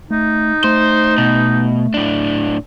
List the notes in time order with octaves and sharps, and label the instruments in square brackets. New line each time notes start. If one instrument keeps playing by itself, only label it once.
[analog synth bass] A3 [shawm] D#4
[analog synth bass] A3 [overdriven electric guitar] C5
[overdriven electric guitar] B2
A2 D4